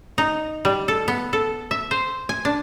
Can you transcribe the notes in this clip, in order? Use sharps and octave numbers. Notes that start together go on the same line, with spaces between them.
D#4
G3
A4
B3
A4
E5
C5
G#5
D4